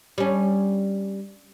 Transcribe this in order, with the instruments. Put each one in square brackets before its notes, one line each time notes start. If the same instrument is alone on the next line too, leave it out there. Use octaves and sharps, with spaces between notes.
[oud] G3 C#4